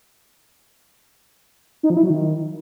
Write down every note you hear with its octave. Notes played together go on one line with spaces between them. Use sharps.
D#4
F3
E4
F#3
D#3